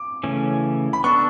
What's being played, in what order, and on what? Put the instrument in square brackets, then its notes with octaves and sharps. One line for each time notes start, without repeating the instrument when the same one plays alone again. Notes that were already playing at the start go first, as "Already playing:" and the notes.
Already playing: [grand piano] D6
[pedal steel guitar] C#3 E3 A3 C#4
[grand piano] B5
[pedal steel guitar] B3 D4 A4 [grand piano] C#6